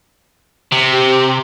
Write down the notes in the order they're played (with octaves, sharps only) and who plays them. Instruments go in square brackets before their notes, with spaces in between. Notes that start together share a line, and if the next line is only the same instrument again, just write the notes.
[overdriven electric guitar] C3
[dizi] G4